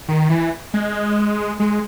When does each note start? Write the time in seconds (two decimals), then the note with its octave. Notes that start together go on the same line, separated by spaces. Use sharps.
0.09 D#3
0.30 E3
0.74 G#3
1.60 G#3